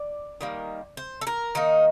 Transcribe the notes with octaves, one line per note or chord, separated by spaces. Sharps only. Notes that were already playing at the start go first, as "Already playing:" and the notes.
Already playing: D5
D#3 G3 A#3
C5
A4
A#4
D#3 A#3 D#4